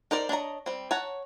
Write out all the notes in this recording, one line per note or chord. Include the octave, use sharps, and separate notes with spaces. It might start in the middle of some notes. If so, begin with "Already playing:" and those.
D#4 A#4 C5 D5
D4 C#5 D#5 A#5
G3 C4
C#5 F#5 A5 A#5